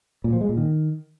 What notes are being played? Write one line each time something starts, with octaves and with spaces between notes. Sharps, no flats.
A#2
F3
G#3
A#2
D#3